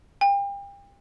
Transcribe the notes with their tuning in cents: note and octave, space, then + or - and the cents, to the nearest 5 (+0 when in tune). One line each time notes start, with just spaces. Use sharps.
G5 +35